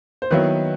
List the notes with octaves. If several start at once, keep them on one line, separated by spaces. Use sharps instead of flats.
C5
D#3 F#3 B3 E4 B4